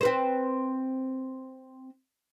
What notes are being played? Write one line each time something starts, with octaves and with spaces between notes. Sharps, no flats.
C4 B4 C5